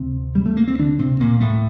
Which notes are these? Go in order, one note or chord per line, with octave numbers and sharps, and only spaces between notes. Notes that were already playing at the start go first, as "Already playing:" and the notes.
Already playing: D2 C3 C4
G3
A3
A#3
C4
D3 D4
C3 C4
A#2 A#3
A2 A3